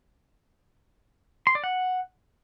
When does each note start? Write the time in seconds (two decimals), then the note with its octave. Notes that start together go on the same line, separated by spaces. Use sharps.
1.47 C6
1.55 D5
1.64 F#5